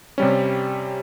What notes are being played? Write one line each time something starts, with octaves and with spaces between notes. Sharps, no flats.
C3 G3 C#4